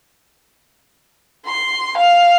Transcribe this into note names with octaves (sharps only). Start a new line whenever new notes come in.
C6
F5